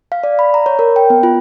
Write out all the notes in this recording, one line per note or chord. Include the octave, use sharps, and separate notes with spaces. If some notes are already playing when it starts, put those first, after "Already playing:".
F5
D5
B5
A#5
C#5
A#4
G5
B3
F4